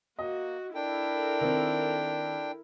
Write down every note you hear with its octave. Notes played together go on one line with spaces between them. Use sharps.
A#3 F#4 D#5
D4 E4 A4 A#4 G5
D#3 C4